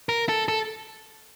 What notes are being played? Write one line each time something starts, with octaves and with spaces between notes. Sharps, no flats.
A#4
A4
A4